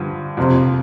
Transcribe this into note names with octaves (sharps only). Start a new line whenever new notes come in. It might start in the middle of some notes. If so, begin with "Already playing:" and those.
Already playing: G2 D3 F3
F2 C3 F3